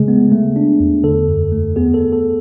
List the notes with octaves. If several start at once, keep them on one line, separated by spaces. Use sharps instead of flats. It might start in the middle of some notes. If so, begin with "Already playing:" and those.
Already playing: C#3 G#3 A3 G#4
B3
A3
D4
E2
D3 A4
F#2
A3
B3 G#4
A4
B3
A4